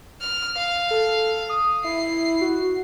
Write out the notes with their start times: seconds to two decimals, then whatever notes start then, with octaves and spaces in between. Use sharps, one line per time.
0.21 F6
0.57 F5
0.91 A4
1.49 D#6
1.84 E4 C7
2.41 F#4